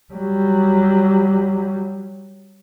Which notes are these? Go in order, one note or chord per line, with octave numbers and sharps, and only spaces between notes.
F#3 G3